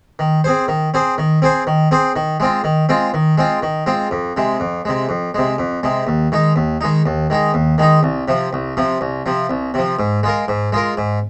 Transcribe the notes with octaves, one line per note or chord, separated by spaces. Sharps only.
D#3
C4 G#4 C5
D#3
C4 G#4 C5
D#3
C4 G#4 C5
D#3
C4 G#4 C5
D#3
G#3 C4 F4
D#3
G#3 C4 F4
D#3
G#3 C4 F4
D#3
G#3 C4 F4
F2
C3 G#3
F2
C3 G#3
F2
C3 G#3
F2
C3 G#3
D#2
D#3 G#3 D#4
D#2
D#3 G#3 D#4
D#2
D#3 G#3 D#4
D#2
D#3 G#3 D#4
C2
C3 F3
C2
C3 F3
C2
C3 F3
C2
C3 F3
G#2
G#3 F4 A#4
G#2
G#3 F4 A#4
G#2